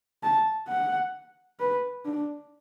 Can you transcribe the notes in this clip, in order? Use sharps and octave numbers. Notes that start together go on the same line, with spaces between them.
A5
F#5
B4
D4